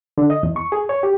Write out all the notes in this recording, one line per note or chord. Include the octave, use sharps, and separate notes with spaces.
D3
D#5
E2
C#6
G#4
C#5
G4